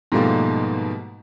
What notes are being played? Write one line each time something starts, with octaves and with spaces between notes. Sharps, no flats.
G#2 B2 F3 G3 A3 A#3